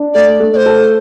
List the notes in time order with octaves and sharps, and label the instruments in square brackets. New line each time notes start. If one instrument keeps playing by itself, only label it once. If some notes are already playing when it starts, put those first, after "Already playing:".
Already playing: [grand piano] D4
[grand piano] A3 [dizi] D5
[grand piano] A3
[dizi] D5
C5
[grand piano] A4